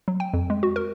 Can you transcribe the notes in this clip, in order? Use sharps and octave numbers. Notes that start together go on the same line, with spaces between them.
F#3
G5
F2
G#3
F#4
A#4